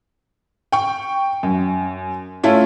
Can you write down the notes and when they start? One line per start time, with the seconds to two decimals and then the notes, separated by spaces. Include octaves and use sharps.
0.72 G5 C#6
1.43 F#2
2.43 A3 C#4 E4 F4